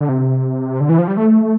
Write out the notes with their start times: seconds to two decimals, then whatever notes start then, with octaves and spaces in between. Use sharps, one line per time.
0.01 D3
0.09 C3
0.80 D3
0.89 E3
0.98 F3
1.08 G3
1.17 A3